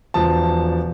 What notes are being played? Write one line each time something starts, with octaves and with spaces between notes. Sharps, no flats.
E1 F3 A5